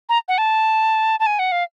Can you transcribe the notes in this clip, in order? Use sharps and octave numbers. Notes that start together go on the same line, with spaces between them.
A#5
F#5
A5
A5
G#5
F#5
F5